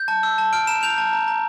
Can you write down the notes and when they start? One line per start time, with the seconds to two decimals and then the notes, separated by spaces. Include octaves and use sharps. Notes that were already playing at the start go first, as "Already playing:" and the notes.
Already playing: G6
0.08 A5
0.23 E6
0.38 A5
0.53 F6 D7
0.67 A#5 E7
0.83 G6 F7
0.98 A5
1.13 A#5
1.28 A#5